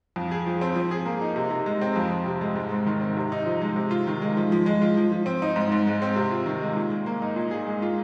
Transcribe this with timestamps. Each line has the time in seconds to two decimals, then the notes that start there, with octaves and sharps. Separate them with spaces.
0.16 F2
0.31 G#4
0.46 F3
0.61 C4
0.76 F3
0.91 G#4
1.06 A#3
1.21 D#4
1.36 C3
1.51 C3
1.66 G#3
1.81 C4
1.96 F2
2.11 F2
2.26 C3
2.41 G#3
2.56 G#2
2.72 G#2
2.86 D#3
3.01 C4
3.17 C3
3.32 D#4
3.46 F3
3.62 G#3
3.76 C3
3.91 F4
4.07 D#3
4.22 G#3
4.37 F3
4.52 F3
4.66 G#3
4.82 F4
4.97 F3
5.12 F3
5.26 C4
5.42 D#4
5.56 G#2
5.72 G#2
5.87 G#3
6.02 C4
6.16 C3
6.31 F4
6.46 D#3
6.62 G#3
6.76 A#2
6.91 A#2
7.06 A#3
7.22 D#4
7.36 A#2
7.51 G#4
7.67 G#3
7.82 F4